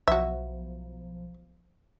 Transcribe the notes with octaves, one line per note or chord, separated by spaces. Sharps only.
B1 F3 F#4 E5